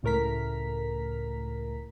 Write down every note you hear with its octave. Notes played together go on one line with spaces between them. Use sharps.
C#2 A2 A3 A#4 A#5 B6